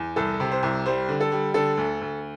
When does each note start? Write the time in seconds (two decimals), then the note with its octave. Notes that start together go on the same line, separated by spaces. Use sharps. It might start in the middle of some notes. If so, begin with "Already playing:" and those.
Already playing: E2
0.16 C2 A4
0.40 C3
0.52 C5
0.63 C2
0.86 G3 C5
1.09 D3
1.21 A4
1.32 G3
1.54 D3 A4
1.77 D2
2.01 D2